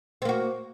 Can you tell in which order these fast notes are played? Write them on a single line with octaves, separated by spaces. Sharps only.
C4 A#3 F#4